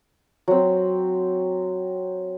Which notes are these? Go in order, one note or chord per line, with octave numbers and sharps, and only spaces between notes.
F#3 C4